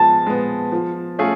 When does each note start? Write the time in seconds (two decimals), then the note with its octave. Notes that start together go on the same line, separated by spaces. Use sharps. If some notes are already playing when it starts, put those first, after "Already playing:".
Already playing: F3 G#3 B3 A5
0.26 G#3 B3
0.72 F3
1.19 A3 C#4 F4 G#4